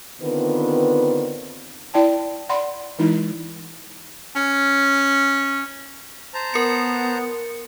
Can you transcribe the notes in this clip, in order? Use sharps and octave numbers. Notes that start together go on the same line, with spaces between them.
D3 D#3 B3 C4 F4 B4
E4 D5 G5 A5
D5 F#5 B5 C6
E3 G#3 D#4 E4
C#4
C5 A5 A#5
B3 A#4 C#7